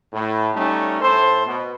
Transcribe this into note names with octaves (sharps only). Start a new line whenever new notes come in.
A2
G3 A3 C#4 D#4
A2 A4 C5
B2